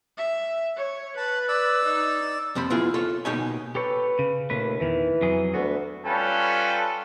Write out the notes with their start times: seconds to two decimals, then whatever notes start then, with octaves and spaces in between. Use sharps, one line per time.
0.18 E5
0.77 C#5
1.17 B4 A5
1.49 D5 E6
1.85 D#4
2.55 F2 C3 C5 B5
2.70 B3 E4 F4 G#4
2.94 F4 A4 C#5
3.25 B2 A#3 D#4 G4 C#5 G#5
3.75 G4 A4 B4 C#5
4.19 C#3
4.50 D#2 A#2 A3 B4
4.80 E2 D#3 E3
5.22 F2 F#3 G#4
5.54 D2 A3 B3 F#4
6.05 G3 C#4 F4 A4 B4 G5